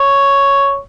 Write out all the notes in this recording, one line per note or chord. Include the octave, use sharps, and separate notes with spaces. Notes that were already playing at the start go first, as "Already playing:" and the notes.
Already playing: C#5